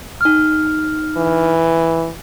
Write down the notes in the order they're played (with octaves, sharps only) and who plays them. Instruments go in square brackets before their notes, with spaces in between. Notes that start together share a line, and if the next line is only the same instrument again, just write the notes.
[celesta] D#4 F6
[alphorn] E3